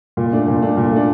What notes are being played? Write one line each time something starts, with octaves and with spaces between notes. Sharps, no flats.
A#2
A3 D4
A#2
A3 D4
A#2
A3 D4